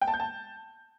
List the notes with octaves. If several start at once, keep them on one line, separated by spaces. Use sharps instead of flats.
G5
A5
G6
A5